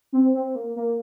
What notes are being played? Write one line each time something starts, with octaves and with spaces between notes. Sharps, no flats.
C4
C4
A#3
A#3